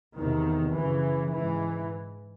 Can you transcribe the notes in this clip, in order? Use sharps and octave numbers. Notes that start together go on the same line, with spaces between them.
E2 C3 D#3
F#2 C#3 E3
G#2 E3